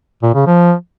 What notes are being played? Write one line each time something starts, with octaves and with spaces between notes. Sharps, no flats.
A#2
C#3
F3